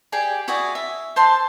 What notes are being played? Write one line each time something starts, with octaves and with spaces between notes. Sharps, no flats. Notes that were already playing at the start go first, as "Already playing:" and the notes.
G4 G#4 D5 G5
E4 F#4 G#4 D5
E5
C5 A5 C6